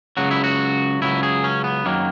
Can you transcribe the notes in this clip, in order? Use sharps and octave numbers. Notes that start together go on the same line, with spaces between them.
C#2 C#3 F#3 F#4
E4
F#4
C#2 C#3 F#3 E4
G#4
C#4
B3
F#2 D#3 F#3 A#3